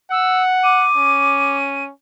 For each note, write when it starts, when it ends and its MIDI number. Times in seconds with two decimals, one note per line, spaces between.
0.12 0.88 78
0.12 0.43 88
0.64 1.57 86
0.64 1.85 99
0.96 1.91 61